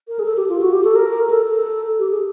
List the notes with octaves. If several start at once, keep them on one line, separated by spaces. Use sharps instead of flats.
A#4
G#4
A4
G4
F4
F#4
G4
A4
A#4
A4
A4
G4
G#4